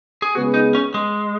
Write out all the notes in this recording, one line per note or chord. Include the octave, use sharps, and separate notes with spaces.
G#4
C#3 G#3 B3 F#4 G#4 B4
D#4
C#4
G#3